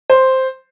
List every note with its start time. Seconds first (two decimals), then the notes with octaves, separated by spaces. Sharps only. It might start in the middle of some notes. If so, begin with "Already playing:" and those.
0.10 C5